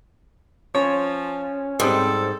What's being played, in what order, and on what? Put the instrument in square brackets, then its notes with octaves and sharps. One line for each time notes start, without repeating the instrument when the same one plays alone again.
[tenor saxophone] F3 [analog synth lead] C#4 [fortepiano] C#5
[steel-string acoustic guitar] G#2 [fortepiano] G3 C4 D#6 [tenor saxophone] A4